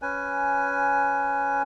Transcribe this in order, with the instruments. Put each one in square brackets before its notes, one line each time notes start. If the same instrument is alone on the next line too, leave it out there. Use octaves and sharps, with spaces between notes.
[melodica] C#4 B4 G#5